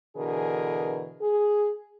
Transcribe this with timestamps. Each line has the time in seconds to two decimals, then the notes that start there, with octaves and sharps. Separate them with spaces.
0.17 B2 D3 E3 G#4 A#4
1.21 G#4